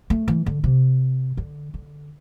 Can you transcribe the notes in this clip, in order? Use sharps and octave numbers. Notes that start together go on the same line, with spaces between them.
A3
E3
D3
C3
D3
D3